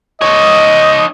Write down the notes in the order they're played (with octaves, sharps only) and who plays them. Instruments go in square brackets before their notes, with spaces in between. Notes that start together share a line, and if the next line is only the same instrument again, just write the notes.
[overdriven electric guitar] D#4 C#5 [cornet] D#5